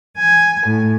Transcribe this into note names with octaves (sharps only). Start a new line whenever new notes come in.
G#5
A2